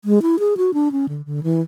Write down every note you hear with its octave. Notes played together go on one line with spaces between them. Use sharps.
G#3
E4
G#4
F#4
D4
C#4
D3
D3
E3